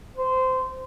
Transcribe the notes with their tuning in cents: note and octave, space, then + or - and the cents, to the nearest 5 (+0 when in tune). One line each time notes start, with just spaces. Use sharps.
C5 -20